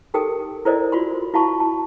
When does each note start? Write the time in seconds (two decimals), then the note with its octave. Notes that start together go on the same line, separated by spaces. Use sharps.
0.14 D#4 G4 A4 A#4 G5 D#6
0.65 E4 A4 A#4 C5 D5 D#5
0.92 F4 F#4 B5 C6
1.34 E4 F#4 F5 A5 B5 C#6
1.60 A5